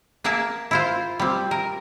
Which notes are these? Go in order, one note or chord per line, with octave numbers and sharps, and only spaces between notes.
A#3 G#4 A#4 E5 A5
E4 F4 C5
G3 C4
A#4